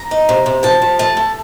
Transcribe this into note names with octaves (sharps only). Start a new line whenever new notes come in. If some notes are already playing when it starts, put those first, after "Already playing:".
Already playing: A#5
D#4
C3
C3
F3 A5
F3
A3 A5
A3